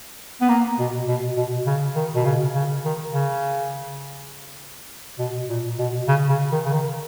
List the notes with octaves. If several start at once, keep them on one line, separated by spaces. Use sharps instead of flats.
B3
A#3
B2
B2
B2
C#3
D#3
B2
C#3
C#3
D#3
C#3
B2
A#2
B2
C#3
C#3
D#3
C#3
D#3